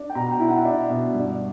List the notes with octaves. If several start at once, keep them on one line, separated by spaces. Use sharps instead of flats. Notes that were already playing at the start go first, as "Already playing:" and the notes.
Already playing: D4
G5
B2 A#5
G5
E4
F#5
D4 E5
B2
G2 D5